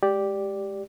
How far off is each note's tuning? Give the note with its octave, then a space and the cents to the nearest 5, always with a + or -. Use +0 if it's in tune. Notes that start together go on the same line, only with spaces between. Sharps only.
G#3 +10 G4 +0 D5 +0